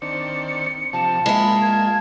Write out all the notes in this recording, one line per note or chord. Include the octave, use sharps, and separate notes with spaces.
D#3 C4 D4 C#7
C3 F3 A5
G#3 A#3 F4 E5 B5
G#6